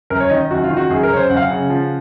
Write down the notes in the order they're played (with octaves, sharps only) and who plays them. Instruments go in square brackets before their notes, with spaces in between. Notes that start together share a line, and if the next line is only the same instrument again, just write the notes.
[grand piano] F#2 A#4
C#5
D#3 D#5
D#5
F#2 F#4
F4
D#3
F#4
F#2 G#4
A#4
F#2 C#5
C5
F#2 F#5
F5
F#5
C#3
F3